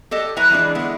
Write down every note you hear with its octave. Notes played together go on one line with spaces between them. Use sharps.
G4 A4 D#5
F#3 E4 B4 G#5 A#5
E3 F3 G3 G#3 D4
D3 G#3 B3 E4